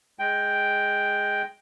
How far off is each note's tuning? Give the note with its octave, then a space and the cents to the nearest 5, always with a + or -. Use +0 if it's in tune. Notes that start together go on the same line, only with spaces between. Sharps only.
G#3 +0 G5 +0